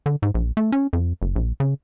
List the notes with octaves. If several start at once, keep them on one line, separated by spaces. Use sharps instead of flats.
D3
G#2
A#1
A3
C#4
F2
F#1
A#1
C#3